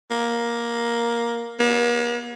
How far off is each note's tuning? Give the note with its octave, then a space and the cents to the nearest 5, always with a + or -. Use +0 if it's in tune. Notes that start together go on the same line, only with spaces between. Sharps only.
A#3 +10
A#3 +45